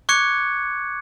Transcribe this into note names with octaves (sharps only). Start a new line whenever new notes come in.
C#6 D6 F#6 G#6 C#7